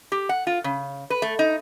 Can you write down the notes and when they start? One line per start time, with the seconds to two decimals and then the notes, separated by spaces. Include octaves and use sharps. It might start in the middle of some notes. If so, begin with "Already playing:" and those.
0.12 G4
0.29 F#5
0.47 F4
0.64 C#3
1.10 B4
1.22 A3
1.39 D#4